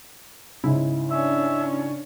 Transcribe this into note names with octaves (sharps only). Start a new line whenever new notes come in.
G#2 C#3 E4
C#4 D4 E5